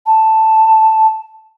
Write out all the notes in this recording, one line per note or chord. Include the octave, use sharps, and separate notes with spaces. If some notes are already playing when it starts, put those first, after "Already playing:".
A5